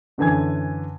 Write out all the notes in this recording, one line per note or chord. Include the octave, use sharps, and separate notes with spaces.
F#2 D3 E3 G#5 G#6